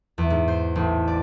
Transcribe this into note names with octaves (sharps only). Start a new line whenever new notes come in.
E2
G#2
C5
A1
D5